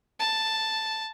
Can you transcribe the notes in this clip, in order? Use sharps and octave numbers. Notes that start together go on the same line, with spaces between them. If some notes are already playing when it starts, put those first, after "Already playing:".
A5